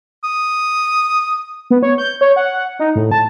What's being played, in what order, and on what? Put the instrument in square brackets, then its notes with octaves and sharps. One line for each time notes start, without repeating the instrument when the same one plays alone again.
[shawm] D#6
[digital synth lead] B3
C#5
G6
C#5
F#5
D#4
A2
A5